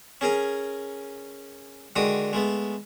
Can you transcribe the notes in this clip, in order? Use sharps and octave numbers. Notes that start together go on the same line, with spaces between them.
C#4 G#4 A#4 G#5
D3 D#3 G#3 F#4 D#6
G#3 A3 B3